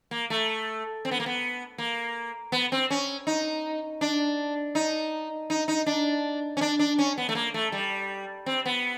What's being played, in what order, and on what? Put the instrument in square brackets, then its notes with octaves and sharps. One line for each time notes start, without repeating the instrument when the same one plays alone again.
[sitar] A#3
A3
C4
B3
A#3
B3
A#3
B3
C4
C#4
D#4
D4
D#4
D#4
D#4
D4
C#4
D4
D4
C#4
B3
A3
A#3
A3
G3
C4
B3